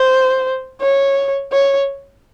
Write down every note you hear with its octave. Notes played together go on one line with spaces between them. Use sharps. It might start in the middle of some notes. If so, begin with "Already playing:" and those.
Already playing: C5
C#5
C#5